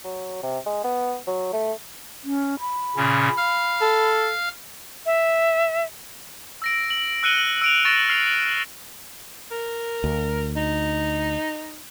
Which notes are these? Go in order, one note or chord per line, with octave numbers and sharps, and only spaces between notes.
F#3
C3
G#3
B3
F#3
A3
C#4
B5
A#2 C#3 C#4
F5 F6
A4
E5
E6 A#6 D7
F#7
E6 F#6 C#7 D#7 G7
E6 D7 F7
C#6 A6 A#6 D7 E7
F6 C7 F7
A#4
D2
D#4